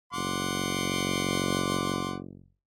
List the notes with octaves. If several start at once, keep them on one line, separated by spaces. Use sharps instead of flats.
F#1 F#5 C6 D6